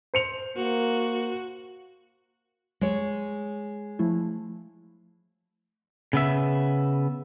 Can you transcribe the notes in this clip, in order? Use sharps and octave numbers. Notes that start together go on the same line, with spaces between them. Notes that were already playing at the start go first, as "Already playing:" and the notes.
C5 C#7 F7
A#3 F#4
G#3 C#5
F3 A3 E4
C#3 B3 E5